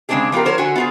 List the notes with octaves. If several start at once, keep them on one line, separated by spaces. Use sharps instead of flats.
C#3 G#3 A3 C4 D4 G#4
F3 B3 F4 G4 A#4
A#4 C5 C#5
D3 F#4 G#5
B3 F4 G#4